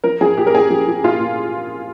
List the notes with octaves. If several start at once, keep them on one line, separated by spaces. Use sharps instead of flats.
F3 A#4
F3 G#4
A#2 G4
A#4
A#2 G#4
F3
F3
A#2 F4
A#2